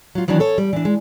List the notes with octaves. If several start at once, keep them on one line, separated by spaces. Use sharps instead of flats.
F#3 F4
D#3 E3 F#3 B3 D4
A4 C#5
G3
E3 D4
G#3